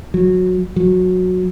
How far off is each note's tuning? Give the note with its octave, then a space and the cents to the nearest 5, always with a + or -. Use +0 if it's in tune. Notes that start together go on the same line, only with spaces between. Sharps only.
F#3 -15
F#3 -15